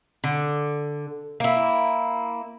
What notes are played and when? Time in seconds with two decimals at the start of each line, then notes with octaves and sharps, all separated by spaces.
0.24 D3
1.40 A#3 E4